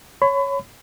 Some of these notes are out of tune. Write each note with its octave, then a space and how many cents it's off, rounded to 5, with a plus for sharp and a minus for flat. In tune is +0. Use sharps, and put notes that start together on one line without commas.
C#5 +0 B5 +35